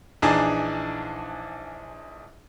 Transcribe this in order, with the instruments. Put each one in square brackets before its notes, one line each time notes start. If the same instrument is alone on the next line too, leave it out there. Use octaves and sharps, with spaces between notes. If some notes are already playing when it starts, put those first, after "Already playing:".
[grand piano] A#1 E3 D4 D#4 G#4 A5